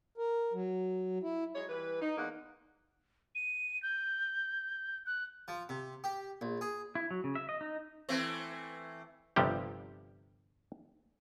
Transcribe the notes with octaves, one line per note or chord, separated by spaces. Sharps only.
A#4
F#3
E4
F#3 G#3 C#5
E3 G3 B4
D#4
E2 G#3 A#3 D#4 F#5
D#7
G6
F#6
F3
C3
G4
A#1
G#4
E4
F#3
C#3
E5
D#5
D#4
E3 A3 C4
G1 C3 F3 G3 G4